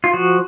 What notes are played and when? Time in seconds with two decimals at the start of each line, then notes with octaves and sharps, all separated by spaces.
0.04 F4
0.13 F3 F#4